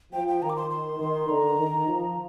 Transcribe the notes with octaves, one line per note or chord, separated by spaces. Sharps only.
F3 G5
G5
D#3 A#5
D6
C6
C6
D#3
D3 A#5
D#3
F3